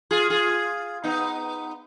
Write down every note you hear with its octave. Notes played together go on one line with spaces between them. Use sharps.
F4 G#4
F4 G#4
B3 D#4